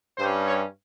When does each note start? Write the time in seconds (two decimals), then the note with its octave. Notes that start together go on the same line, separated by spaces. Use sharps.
0.18 G2 G3 C#4 C5
0.47 C#5